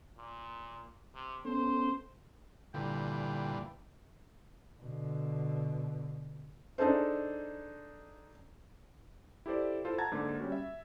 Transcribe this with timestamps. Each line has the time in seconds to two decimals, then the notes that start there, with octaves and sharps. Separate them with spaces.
0.17 A#2
1.15 C3
1.45 B3 C#4 A4 C5
2.74 G2 A#2 D3 E3 G5
4.80 B2 D3
6.78 D4 D#4 G#4 A4 C5
9.46 E4 G4 A4 C5 D5
9.85 E4 F4 A4 C5
9.98 F#5 A5 A#5 G#6 A6
10.12 G#2 D3 A#3
10.39 G3 C#4 F#4
10.52 E5